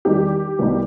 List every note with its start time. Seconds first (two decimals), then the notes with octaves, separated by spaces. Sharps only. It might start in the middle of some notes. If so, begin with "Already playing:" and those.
0.05 E2 D#3 G3 D#4 G4
0.59 C2 B2 G3 B3 D#4